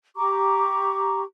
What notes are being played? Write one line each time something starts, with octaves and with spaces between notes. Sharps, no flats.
G4 A#5 C#6 D6